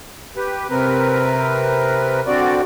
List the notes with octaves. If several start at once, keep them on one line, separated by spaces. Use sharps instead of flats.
G4 B4
C3 C4 A#4 B4
D3 C4 F#4 D5